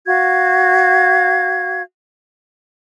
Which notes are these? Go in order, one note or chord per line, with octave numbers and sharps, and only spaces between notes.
F#4 F5 G#6